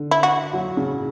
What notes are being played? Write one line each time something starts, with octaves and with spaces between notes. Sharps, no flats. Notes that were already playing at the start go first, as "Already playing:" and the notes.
Already playing: D3
E4
F#4
F#3
C#3